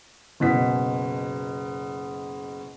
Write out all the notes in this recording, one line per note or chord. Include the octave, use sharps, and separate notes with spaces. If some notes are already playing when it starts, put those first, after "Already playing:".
F#1 B2 B6